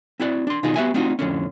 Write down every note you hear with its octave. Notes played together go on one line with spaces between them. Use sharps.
C4 E4 F#4 D5
D4 C6
B2 D#3 D#4 F4 G#4
B3 F#4 G4 E5 G#5
A3 C4 D4 D#4 F4 F#4
F2 A2 D3 C#4